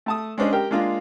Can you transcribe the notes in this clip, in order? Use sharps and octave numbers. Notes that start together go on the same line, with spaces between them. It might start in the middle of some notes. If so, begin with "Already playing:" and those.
A3 A5 D#6
G#3 C#4 D4 C5 D#5
G4 A#4 G5
G#3 A#3 D4 F4 F5